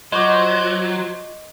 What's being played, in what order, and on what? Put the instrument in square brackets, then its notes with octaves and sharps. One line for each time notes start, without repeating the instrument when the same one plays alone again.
[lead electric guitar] F#3 [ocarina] F4 [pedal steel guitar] C5 [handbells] D#5 C#6 D6